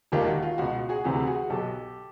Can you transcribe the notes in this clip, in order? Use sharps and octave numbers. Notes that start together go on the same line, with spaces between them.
E1 D#2 D#3 F4 G4
F#4
F4
C#2 B2 F#4
F#4 G#4
D2 C3 E3 F#4 G#4
F#4 G#4
B1 B2 G4 A4